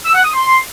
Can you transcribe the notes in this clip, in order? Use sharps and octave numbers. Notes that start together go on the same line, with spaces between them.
E6
F#5
D#6
C6